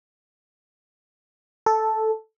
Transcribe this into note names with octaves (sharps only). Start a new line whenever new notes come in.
A4